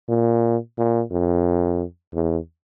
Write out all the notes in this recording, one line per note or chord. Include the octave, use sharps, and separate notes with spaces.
A#2
A#2
F2
E2